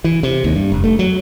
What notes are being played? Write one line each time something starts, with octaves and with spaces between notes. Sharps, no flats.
E3
C3
D#2
G2
F1
A3
F#3